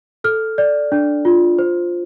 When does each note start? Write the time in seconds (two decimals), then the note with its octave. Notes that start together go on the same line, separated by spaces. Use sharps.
0.24 A4 F6
0.58 D5
0.92 D4
1.25 F4
1.59 C5